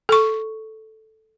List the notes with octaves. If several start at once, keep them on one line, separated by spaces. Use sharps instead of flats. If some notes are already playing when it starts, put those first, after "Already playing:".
A4 C#6